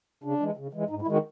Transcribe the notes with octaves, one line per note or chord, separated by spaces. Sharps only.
C#3 D4
E3 G#3
C#3
E3 G#3
G#2 D#4
E4
D#3 G#3 F#4